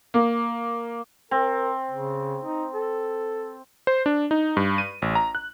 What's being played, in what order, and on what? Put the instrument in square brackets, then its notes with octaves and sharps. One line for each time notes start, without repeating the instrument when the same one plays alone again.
[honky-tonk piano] A#3
[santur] C4 [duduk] A#4
[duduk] C#3
D#4
A4
[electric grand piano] C5
D4
D#4
G2
D#7
A1
A#5
F#6